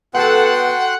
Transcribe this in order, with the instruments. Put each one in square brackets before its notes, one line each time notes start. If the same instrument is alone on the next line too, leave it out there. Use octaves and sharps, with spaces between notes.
[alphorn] B3 [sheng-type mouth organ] F#4 G5 C6 [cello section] A4 [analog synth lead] F#5